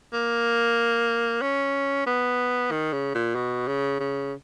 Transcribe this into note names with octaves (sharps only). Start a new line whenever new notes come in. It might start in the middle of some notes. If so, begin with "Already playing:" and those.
A#3
C#4
B3
D#3
C#3
A#2
B2
C#3
C#3